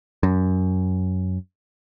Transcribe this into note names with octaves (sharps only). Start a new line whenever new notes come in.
F#2